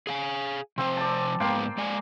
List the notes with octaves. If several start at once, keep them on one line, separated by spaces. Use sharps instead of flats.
G#4 F5 G#5
C3 F3 C4 C5
D5 A5
G#2 G#3 A#3 B3 G5 C6
G#3 D5 G#5